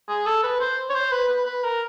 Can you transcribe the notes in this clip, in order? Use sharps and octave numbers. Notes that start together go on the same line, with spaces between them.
G#4
A4
B4
C5
C#5
C5
B4
B4
B4
A#4